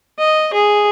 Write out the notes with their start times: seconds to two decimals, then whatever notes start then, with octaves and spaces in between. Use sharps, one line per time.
0.19 D#5
0.53 G#4